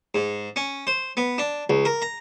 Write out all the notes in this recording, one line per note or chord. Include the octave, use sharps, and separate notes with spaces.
G#2
C#4
C5
B3
D4
C#2
A#4
A#5